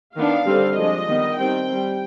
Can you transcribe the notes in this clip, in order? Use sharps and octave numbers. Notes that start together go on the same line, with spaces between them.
D#3 B3 D4 F5
D3 G3 C4
F3 G#3 D4 D#5
D#3 G3 B3
D#3 G3 C4 G5
G3 C4